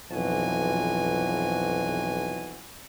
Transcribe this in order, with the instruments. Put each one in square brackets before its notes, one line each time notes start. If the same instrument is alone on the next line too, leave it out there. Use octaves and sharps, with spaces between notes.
[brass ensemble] B1 F2 E3 F3 F#4 G#5